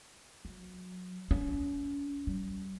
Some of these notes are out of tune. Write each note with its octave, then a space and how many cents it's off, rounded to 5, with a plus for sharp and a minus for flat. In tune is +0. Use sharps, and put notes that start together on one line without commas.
F#3 -25
C#4 +35
G3 -35